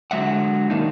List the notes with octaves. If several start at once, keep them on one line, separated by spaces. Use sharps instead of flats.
D3 F#3 G#3 E5 F#5
D#3 A#3 D4 D#4